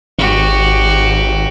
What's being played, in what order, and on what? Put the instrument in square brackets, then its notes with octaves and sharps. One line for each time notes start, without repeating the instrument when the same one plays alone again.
[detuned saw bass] G#1 [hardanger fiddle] F#4 G4